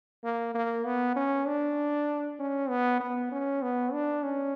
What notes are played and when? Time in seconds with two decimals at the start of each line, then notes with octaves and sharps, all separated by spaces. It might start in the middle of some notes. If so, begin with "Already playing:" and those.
0.24 A#3
0.55 A#3
0.85 B3
1.16 C#4
1.47 D4
2.39 C#4
2.69 B3
3.00 B3
3.32 C#4
3.63 B3
3.93 D4
4.24 C#4